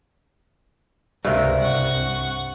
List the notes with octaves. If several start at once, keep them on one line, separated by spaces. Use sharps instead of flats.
C#2 G2 C3 A#4
C2 F#5 C#6